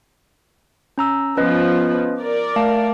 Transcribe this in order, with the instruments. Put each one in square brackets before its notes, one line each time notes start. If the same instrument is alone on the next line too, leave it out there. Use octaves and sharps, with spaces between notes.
[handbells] C#4 A#5 E6
[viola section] F3 B3 [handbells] C#4 B4 D#5
[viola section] A#4 D5
[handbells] A3 F5 A5